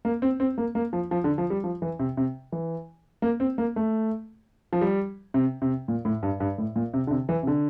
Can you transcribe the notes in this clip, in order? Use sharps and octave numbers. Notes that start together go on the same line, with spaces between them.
A#3
C4
C4
A#3
A#3
F3
F3
D3
F3
G3
F3
E3
C3
C3
E3
A#3
C4
A#3
A3
F3
G3
C3
C3
A#2
A2
G2
G2
A2
A#2
C3
D3
C3
E3
C3
D3